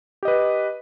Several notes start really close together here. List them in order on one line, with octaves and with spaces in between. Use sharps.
G4 D#5 B4